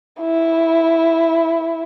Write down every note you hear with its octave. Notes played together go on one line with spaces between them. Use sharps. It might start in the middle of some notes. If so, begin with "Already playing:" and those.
E4